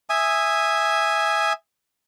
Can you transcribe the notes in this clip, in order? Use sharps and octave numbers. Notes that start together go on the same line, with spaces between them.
E5 G#5 D#6